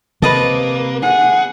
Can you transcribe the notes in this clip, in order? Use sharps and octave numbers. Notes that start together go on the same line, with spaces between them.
C3 A#3 B4 D#5 A5
G#4 F#5